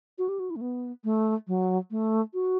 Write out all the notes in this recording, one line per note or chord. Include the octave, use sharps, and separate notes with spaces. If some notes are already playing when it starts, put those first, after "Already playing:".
F#4
G4
F#4
E4
A3
B3
A3
F#3
A3
F#4